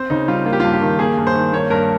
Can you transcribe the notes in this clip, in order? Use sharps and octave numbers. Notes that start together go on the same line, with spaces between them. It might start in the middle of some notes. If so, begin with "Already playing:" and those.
Already playing: C4 C5
C#3 D#4
G3 F4
A#3 F4
G4
G2 F4
G4
D#3
A#3 G#4
G2
C5
D#3
A#3 C#5
G2 A#4